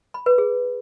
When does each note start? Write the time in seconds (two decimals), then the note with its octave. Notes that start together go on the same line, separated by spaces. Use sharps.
0.14 B5
0.26 B4
0.38 G#4